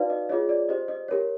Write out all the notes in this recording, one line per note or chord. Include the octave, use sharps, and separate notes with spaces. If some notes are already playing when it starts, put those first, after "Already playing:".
Already playing: D#4 F#4 B4 D5 F5
D#5
F4 G#4 C#5 D#5
D5
G4 C5 D#5
D#5
G4 A#4 C#5